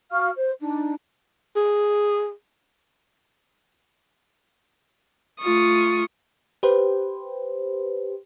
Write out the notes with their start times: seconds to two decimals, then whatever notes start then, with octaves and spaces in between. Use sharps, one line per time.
0.12 F#4 F5 C#6 F6
0.36 C5
0.61 D4 D#4
1.56 G#4
5.41 A3 F4 C#6 D#6
6.63 G4 B4 C5